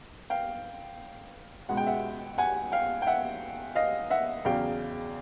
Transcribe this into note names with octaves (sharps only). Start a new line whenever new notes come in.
F5 G5
C#2 B2 G#3 F#5
G5
E5 F#5
F#5 G#5
F5 G5
G5
E5 F#5
D#5 F5
E5 F#5
E2 C#3 F#3 F5 G5